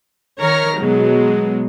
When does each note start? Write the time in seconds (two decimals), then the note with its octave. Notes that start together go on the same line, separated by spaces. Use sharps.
0.39 D#3 A#4 C#5 A#5 F6
0.78 B2 F#3 G#3